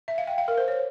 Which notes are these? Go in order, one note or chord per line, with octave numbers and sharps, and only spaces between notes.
E5
F5
G5
F5
A#4
C5
C#5